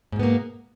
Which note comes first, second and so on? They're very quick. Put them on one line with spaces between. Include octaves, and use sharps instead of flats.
G#2 B2 B3 A#3